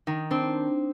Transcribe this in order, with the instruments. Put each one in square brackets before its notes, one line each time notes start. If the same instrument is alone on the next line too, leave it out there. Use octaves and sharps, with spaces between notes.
[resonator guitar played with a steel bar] D#3 [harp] D#4
[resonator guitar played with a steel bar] C4 [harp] D4